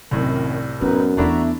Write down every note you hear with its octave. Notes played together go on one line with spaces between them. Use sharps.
C2 F#2 A2 C3 D#3 F#3
F#2 B3 D#4 B4
E2 A3 B3 D4 E4 F#4 E5 A#5